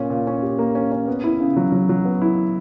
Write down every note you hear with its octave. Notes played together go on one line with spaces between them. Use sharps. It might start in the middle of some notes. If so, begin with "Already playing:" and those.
Already playing: A#2 C#4
A#2
C#4
G4
A#3
C#4
C#4
B3
E4
C#3
F#3
F#3
F#3
B3
E4